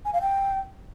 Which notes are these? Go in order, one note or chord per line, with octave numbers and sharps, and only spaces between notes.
G#5
F5
G5